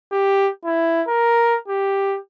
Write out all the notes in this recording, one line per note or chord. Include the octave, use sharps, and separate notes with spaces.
G4
E4
A#4
G4